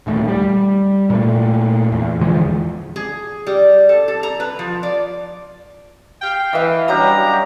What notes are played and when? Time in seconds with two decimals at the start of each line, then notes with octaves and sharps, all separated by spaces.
0.07 D#1 D#2 A3
0.28 G3
1.10 A#2 A3
1.92 E2
2.21 D3 E3 F3 G#3
2.96 G#4
3.47 G3
3.89 A4
4.08 A4
4.23 A#5
4.40 B4
4.59 F3
4.83 D5
6.22 F5 G5
6.53 E3 D#5 F5
6.88 F#3 G3 C#4 D4 G4 A#5